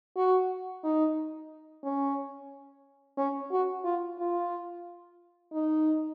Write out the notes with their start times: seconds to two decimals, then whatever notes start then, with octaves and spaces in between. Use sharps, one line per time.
0.17 F#4
0.84 D#4
1.84 C#4
3.17 C#4
3.51 F#4
3.84 F4
4.19 F4
5.53 D#4